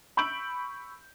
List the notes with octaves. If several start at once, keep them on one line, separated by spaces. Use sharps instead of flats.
B5 C#6 E6 G6 D7 F#7